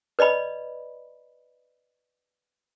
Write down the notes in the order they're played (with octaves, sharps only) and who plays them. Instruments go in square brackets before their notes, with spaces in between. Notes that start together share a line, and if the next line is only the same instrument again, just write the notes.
[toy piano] B4 D5 D#5 B5